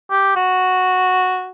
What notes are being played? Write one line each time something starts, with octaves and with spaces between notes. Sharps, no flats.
G4
F#4